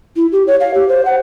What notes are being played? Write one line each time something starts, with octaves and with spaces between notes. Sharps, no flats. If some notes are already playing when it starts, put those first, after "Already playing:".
E4
G4
C#5
F5
G4
C5
F#5